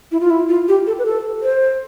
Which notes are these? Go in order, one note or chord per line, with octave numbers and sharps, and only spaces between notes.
E4
F4
E4
F4
G4
A4
B4
A4
C5